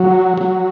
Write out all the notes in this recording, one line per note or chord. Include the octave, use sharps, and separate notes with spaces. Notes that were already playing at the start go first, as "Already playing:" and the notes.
Already playing: F#3
F#3